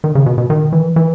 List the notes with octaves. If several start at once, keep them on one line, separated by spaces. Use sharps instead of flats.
D#3
C#3
B2
B2
D#3
E3
E3